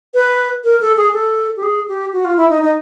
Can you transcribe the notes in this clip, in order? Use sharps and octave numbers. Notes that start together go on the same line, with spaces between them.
B4
A#4
A4
G#4
A4
G4
G#4
G4
F#4
F4
E4
D#4
D#4